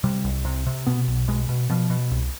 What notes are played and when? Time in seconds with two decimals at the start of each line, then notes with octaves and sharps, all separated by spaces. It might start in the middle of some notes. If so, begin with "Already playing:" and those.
0.04 C3 G3
0.24 C2
0.45 C3
0.67 C3
0.87 B2 B3
1.07 B1
1.28 B2 G#3
1.49 B2
1.70 B2 F3
1.90 B2
2.11 C2